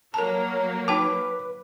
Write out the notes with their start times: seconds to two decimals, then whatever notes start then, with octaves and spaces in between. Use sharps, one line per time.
0.14 F#3 A#3 A#4 A5 A#5
0.88 D#4 B4 G5 A5 D6